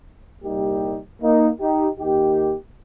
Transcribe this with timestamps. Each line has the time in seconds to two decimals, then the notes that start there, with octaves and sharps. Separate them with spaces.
0.43 C2 A#2 G3 A#3 D#4 G4
1.22 A#3 D#4
1.61 D#4 G4
2.00 D#2 D#3 A#3 D#4 G4